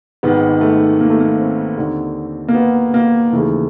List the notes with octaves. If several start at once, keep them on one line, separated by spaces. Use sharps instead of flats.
G#1 G#2 D#3 B3
A3
A#3
A3
A#3
C4
D#2 D3
A#3
B3
A#3
D#2 C#3 E3 A3